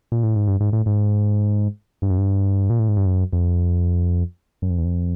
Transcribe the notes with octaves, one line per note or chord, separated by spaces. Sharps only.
A#2
A2
G#2
G2
G#2
A2
G#2
G2
F#2
G2
A#2
A2
G#2
G2
F#2
F2
F#2
F2
E2
F2